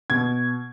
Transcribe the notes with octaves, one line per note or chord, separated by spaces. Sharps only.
B2 G#6